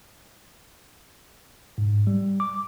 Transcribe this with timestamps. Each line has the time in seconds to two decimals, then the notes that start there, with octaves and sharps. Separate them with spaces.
1.78 G#2
2.07 G3
2.40 D6